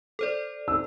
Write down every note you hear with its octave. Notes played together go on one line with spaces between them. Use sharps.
A4 C5 D5
E6